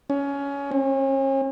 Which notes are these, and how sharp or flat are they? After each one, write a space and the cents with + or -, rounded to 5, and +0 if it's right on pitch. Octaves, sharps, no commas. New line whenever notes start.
C#4 +20
C#4 -40